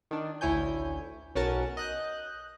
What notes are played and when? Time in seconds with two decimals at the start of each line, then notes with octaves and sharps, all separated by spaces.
0.11 D#3 D4
0.41 A1 D2 E4 C#5 G#5 G6
1.35 B1 C#4 F#4 A#4 A5
1.77 D#5 F#6 G6